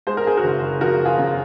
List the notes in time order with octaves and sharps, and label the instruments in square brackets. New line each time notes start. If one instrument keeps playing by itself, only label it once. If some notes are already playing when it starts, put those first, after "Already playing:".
[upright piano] G#3 C5
A#4
G#4
F#4 A#4
F#1
F3 F#4 A#4
F4 G#4
F#2